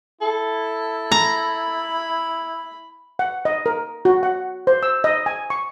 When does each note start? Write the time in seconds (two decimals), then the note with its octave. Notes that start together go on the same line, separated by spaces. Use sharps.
0.21 E4 A4
1.12 A#5 B5
3.19 F#5
3.45 D#5
3.66 A#4
4.05 F#4
4.23 F#5
4.67 C5
4.83 E6
5.04 D#5
5.26 G#5
5.50 C#6